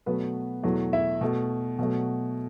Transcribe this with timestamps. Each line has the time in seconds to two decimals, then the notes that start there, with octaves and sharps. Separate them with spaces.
0.06 B2 F#3 A3 B3 B4
0.63 E2 B2 F#3 A3
0.93 E4 E5
1.21 B2 A3
1.79 B2 F#3 A3